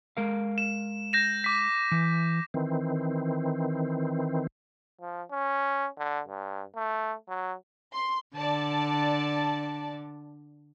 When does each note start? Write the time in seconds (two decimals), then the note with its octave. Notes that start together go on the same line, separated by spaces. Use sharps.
0.17 G#3 A#4 F5
0.58 E7
1.13 G6 A#6 E7
1.44 D6 B6
1.92 E3
2.54 D#3 E3 C4
5.01 F3
5.31 C#4
5.98 D3
6.28 G2
6.76 A3
7.28 F#3
7.93 C6
8.37 D3 D5 A5